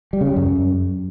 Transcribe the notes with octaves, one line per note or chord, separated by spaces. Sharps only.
G3
C#3
G3
F#2